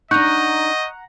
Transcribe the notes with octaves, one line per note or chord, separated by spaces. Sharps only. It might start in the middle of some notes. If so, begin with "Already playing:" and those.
D4 D#4 D#5 F#5 A#5 C#6 G6